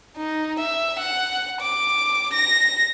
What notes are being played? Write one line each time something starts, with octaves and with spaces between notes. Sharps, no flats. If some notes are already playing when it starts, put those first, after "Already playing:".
D#4
E5
F#5
D6
A#6